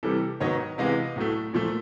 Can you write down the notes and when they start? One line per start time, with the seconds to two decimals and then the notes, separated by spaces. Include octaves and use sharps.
0.03 C3 E3 G3 A4
0.40 G#2 D#3 F#3 B3 C#5 D#5
0.78 C3 E3 G#3 B3 D#5 F5
1.16 A2 F#3 A3
1.54 A#2 F3 A3